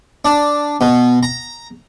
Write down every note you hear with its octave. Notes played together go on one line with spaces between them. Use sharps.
D4
B2
A#5